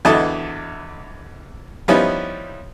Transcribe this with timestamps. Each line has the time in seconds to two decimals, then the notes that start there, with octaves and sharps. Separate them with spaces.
0.05 G#1 E2 D3 E4 A4 D#5
1.88 F3 G3 B3 C#4 D#4 E4